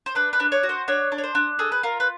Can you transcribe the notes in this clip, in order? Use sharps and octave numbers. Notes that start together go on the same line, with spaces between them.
C5
D4 B4
B4
D4
C#5
F#4
C5
D4 C#5
D4
C#5
C5
D4
G#4 A4
B4
F4 A#4
B4